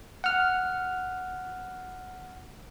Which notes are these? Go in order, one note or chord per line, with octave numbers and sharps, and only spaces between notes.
F#5 F6